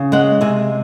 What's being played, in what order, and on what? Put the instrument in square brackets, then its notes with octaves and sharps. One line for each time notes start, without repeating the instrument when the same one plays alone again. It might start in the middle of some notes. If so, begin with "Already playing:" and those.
Already playing: [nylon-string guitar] C#3
G#3 F#5
C3 G#5